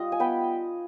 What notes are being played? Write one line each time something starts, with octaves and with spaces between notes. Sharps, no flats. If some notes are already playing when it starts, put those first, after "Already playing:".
Already playing: G3 D#4 F4 D#5
G#5
B3 G5 B5